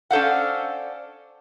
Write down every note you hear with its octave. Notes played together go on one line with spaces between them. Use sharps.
C#4 D4 A4 C5 F5 F#5